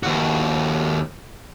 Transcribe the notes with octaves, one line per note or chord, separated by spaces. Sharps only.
D#2 F#4